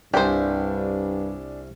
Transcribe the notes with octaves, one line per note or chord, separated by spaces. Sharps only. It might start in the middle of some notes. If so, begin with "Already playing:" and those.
C2 G2 D4 G4 C5 G#5